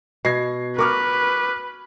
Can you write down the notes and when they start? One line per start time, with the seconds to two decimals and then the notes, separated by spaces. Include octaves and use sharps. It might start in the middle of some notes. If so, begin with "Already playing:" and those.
0.25 B2 G#6 A#6 C7
0.78 A#4 B4 C#6 D6 F6